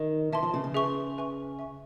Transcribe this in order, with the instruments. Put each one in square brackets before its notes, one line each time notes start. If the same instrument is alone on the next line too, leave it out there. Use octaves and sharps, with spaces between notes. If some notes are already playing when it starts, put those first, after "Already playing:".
Already playing: [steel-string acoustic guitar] D#3
[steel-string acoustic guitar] E3 [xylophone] E5 A5 C6
[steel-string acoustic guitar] F3
C#3
C#3
[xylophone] G#4 B4 E5 G#5 C#6
G#4 B4 E5 G#5 C#6
E5 G#5 C#6